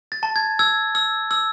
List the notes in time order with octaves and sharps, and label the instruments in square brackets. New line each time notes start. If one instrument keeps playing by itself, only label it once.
[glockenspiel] A6
A5
G#6
E6 G#6
E6
E6